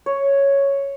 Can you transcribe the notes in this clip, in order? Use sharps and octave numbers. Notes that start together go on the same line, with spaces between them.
C#5